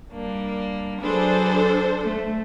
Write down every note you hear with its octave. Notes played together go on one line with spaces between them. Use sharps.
G3 A#3 D4
F#3 D4 G#4 A4 B4 C5
A3